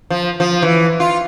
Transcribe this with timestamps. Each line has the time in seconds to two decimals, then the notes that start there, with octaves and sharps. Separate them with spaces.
0.10 F3
0.40 F3
0.62 E3
1.00 F4